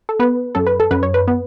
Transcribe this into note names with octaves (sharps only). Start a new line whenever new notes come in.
A4
B3 B4
F#2 A4
B4
A4
F#2 B4
C#5
B4
B3